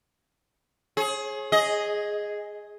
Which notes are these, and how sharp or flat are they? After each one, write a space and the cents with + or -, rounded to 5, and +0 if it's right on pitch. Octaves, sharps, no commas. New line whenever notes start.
G#4 +20 C#5 -35
G#4 +0 D#5 +0